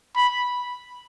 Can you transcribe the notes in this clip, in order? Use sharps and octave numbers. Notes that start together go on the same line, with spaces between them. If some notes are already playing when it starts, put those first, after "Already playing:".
B5